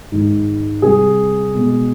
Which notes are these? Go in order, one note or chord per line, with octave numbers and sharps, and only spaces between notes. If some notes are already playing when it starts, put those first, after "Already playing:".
G#2 D#3 G#3
C3 G3 G#4
B2 G#3